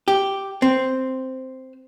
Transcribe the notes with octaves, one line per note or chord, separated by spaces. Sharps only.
G4
C4